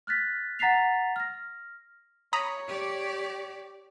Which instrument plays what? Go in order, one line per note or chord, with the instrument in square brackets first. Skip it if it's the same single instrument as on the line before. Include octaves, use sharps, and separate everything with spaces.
[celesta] F6 F#6 A6 B6
F#5 A#5 A6 B6 C7 F7
F6 A#6
[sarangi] C#5 [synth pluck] A#5 B5 D#6
[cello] G4 D5